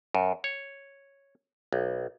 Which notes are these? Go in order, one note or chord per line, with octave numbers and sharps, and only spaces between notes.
F#2
C#5
B1